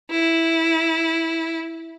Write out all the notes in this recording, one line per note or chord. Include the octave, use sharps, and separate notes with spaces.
E4